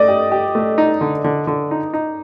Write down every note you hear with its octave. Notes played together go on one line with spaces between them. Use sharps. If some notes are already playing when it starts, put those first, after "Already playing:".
Already playing: A3 D5 D#5
G4
G4
A3
D#4
D3
D3
D3
D#4
D#4